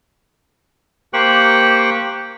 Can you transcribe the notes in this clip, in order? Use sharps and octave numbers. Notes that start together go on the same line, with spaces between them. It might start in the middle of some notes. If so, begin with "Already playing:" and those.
A#3 G4 C5 G5 C#6 F#6